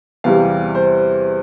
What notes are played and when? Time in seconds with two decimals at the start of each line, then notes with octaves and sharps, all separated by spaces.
0.24 E2 C3 E3 G3 F5
0.75 C5